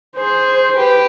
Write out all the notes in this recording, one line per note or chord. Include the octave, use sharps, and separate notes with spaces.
G#4 C5
G4 B4